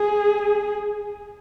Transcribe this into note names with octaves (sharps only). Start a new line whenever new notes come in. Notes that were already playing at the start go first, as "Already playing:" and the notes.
Already playing: G#4